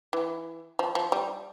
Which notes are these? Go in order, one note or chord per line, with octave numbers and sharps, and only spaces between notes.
E3
F3
F3
G3